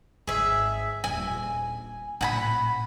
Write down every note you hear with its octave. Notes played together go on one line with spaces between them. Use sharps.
G#1 G#4 E5
D#1 A#1 G#5
A1 A#2 F#5 G#5 B5